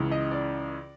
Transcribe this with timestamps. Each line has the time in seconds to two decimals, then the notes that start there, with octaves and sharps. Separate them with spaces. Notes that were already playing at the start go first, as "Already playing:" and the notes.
Already playing: C#2 C#3 E3
0.11 D#5
0.31 D5